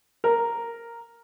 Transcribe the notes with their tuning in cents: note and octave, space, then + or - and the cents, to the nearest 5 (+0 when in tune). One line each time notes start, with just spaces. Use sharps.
A#4 -5